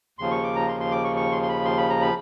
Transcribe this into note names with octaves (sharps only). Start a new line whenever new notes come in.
D#2 C#3 F3 C6
C#6
D6
A#5
C6
C6
D6
C#6
C#6
C6
C6
B5
C6
B5
A#5
B5